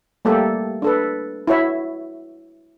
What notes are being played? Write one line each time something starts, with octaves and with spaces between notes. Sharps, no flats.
G3 A3 A#3 G4 A4
D4 A4 B4
E4 F#4 C#5 E5